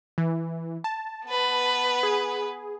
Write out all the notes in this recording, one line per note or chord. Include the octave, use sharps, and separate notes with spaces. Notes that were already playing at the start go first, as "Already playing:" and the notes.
E3
A5
B3 B4
G#4